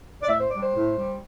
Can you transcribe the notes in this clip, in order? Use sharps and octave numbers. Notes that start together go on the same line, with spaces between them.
D5
A2 E5
C5
G3 D4 D5
C5
A2
G3 D4